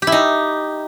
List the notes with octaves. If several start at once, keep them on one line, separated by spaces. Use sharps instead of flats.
G4
E4
D#4